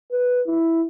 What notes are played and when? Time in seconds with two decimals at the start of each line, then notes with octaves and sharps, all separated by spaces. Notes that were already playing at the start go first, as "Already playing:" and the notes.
0.12 B4
0.47 E4